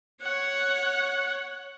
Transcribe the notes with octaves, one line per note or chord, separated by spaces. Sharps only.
C#5 F#5